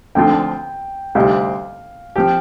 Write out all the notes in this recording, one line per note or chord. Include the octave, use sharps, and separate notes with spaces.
D2 D3 F3 C4 F4 G5
D2 C3 G3 C4 D#4 F5
F3 C4 G4 G5